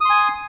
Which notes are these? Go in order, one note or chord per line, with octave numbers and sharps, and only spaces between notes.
G#5 C6 D#6